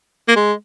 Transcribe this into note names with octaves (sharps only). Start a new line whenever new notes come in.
A#3
G#3